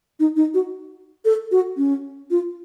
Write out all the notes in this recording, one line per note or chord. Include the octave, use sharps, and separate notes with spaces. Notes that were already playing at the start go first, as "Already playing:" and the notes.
D#4
D#4
F#4
A4
F#4
C#4
F4